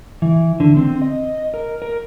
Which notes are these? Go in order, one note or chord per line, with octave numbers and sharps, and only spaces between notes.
E3
D3
C4
D#5
A#4
A#4